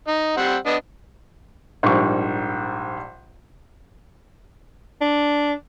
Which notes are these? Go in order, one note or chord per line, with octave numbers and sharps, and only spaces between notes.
D#4
G3 C4 F#5
B3 D4 D#5
A#1 G#2 G3 C#6
D4